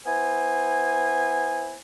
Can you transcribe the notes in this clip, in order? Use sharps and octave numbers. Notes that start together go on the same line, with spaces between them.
B3 E4 C5 G#5